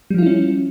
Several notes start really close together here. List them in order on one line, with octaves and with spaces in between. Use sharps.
G3 F3 F4 E4 C#4